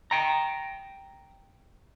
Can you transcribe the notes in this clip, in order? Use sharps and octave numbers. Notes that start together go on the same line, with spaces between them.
G5 A#5